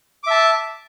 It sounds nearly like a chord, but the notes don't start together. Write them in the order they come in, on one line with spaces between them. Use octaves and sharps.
D6 E5 A5